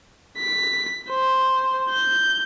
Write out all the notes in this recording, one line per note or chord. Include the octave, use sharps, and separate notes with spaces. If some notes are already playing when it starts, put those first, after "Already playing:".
B6
C5
G6